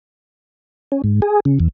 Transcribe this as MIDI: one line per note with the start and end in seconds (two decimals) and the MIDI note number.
0.92 1.02 61
1.04 1.21 44
1.22 1.40 68
1.45 1.59 49
1.60 1.68 40